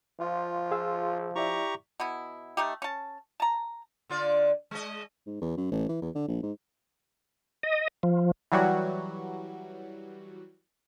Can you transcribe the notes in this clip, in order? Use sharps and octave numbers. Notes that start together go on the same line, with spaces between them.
F3 F4
G#4 F5 E6
E4 G4 D5 E5 A#5 C#6
B2 B3 E4
A3 D#4 G4
C#4 A5
A5 A#5
D3 F4 D5
G#3 D#5
G#2
E2
F#2
A1
E3
E2
D3
A#1
G#2
D#5
F3
E3 F#3 G3 F#4